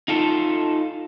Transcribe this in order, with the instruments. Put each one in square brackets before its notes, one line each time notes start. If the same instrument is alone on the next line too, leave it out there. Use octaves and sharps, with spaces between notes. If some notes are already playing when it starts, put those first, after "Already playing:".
[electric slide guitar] D#4 F4 A4